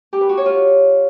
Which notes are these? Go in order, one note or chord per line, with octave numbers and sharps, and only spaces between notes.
G4
B4
F#4
C#5
F4